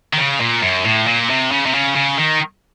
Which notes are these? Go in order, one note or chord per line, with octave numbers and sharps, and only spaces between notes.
D#3
C#3
A#2
F#2
A2
A#2
C3
C#3
C3
C#3
C#3
D#3